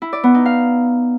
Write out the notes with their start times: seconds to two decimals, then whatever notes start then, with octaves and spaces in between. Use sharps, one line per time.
0.02 E4
0.13 D5
0.24 B3
0.35 D#4
0.45 F5